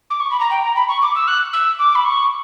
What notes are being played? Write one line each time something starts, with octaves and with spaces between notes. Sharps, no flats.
D6
C#6
B5
A#5
G5
A#5
B5
C#6
D6
E6
F#6
E6
D6
B5
C#6